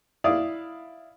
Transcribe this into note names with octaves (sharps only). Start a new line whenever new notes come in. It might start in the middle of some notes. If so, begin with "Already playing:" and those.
E4 D5 F5 D#6